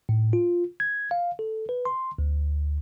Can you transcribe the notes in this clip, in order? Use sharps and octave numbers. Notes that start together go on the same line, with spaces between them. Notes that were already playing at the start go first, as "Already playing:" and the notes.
A2
F4
G#6
F5
A4
B4
C6
D2